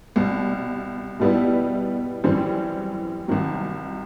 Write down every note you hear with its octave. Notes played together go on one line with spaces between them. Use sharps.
C2 B2 G3
B2 G3 B3 E4
F#2 E3 G3 C4
C2 C3 D#3 F#3